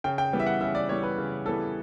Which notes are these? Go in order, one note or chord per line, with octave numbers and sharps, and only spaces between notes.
C#3 G5
G5
E3 G3 B3
E5
F#5
C#3 E5
D5
E3 G3 B3 C#5
B4
C#3
E3 G3 B3 A4